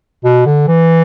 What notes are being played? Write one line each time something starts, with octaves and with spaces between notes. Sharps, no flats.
B2
D3
E3